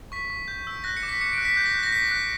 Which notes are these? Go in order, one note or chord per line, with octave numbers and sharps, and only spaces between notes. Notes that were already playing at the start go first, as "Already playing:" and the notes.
C#6 B6
C#6
G6
E6
F#6 A#6
C#7
D6
B6
D6 C#7
F#6 D7
B6
F#6 G6
A#6
F#6 G6
A#6
C#6 B6
F#6